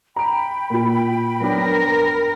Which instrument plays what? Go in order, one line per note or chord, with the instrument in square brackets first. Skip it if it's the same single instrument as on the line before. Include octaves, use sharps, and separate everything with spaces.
[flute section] G5 B5 [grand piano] A#5 D7
[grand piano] A#2 F4
[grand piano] F#3 B3 D4 [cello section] A#4